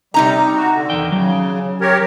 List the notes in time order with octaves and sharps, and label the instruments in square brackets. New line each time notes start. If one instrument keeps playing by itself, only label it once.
[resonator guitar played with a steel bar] C3 D#4 A#5 [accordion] G3
[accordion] F#4
D3
[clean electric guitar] E2 D#3 G5
[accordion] C#3 [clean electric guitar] F#3
[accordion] G4 A#4 C#5